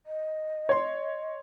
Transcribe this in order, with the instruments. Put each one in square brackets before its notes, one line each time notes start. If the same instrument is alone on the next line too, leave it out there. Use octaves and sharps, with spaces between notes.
[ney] D#5
[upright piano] C#5 C6